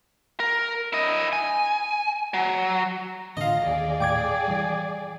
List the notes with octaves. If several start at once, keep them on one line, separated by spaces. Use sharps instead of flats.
A#4
E4 D#5
G#5
F#3
A1 D3 F4 D#5 F5 A#6
D#2 G#4 D5
D#1 A1 A2 G5 D6 G#6
E3 G3